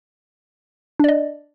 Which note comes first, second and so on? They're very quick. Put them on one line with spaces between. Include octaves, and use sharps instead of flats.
D4 D5 D#5